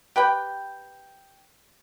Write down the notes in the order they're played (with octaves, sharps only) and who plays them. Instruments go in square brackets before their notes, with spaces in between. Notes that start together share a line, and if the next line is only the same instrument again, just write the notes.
[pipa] G4 B4 G5